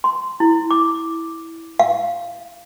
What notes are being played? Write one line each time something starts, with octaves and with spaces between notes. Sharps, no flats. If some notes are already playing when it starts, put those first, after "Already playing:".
C6
E4
D6
F5